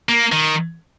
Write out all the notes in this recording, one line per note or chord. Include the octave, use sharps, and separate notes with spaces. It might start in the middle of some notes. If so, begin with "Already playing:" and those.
A#3
D#3